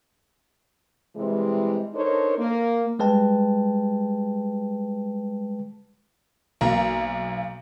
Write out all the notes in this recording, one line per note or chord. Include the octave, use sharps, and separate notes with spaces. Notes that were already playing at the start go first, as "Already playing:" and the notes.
C3 E3 G3 G#3
D4 D#4 A4 A#4 C5 C#5
A#3
G3 G#3 B4 G5 A5
B1 A#3 A#5